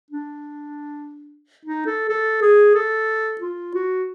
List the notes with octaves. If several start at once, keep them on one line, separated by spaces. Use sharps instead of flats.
D4
D#4
A4
A4
G#4
A4
F4
F#4